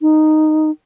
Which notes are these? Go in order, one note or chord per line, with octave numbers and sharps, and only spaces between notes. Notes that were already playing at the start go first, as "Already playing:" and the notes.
D#4